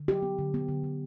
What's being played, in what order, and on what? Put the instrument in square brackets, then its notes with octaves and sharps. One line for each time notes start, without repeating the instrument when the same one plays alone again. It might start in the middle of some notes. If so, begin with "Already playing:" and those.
Already playing: [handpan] D3
F#3 G4
B3
D3
B3
D3
D3